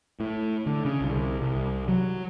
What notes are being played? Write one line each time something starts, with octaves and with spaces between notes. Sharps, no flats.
A2
D3
C#3
C2
C2
F#3